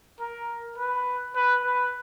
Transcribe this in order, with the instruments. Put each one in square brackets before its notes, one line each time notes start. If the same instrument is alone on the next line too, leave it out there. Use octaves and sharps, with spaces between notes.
[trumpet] A#4
B4
B4
B4